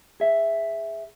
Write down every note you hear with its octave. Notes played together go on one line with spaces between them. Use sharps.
G#4 E5